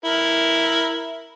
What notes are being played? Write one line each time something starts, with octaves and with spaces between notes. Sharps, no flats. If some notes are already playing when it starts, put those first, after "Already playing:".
E4 A#4